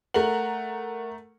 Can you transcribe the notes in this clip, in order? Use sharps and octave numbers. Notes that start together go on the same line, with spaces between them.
A3 A#4 F#5 A#5 F#7